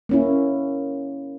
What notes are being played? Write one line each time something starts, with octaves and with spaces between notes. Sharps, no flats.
A#3 C#4 E4